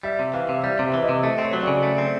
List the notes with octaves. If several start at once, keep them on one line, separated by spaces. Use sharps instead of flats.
G3 E5
C3
E3 F5
C3
G3 E5
C3 E5
E3
D#5
C3
A3 D#5
C4
C#5
F#3
C#3 D5
A3
C4